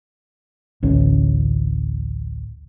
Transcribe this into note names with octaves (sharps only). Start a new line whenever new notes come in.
A1 D2 C#4